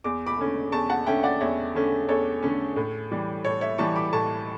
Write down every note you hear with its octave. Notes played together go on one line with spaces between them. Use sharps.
E2 D6
B5 D6
D3 A3 C#4
E2 A5 C#6
F#5 A5
D3 A3 C#4 E5 G5
D5 F#5
E2 C#5 E5
D3 A3 C#4
E2 A4 C#5
D3 A3 C#4
A2
E3 G3
A2 A4 C#5
C#5 E5
E3 G3 A5 C#6
B5 D6
A2 A5 C#6